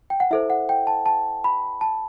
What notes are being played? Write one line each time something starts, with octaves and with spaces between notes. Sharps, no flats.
G5
F#5
E4 A4 C5 E5
F#5
G5
A5
A5
B5
A5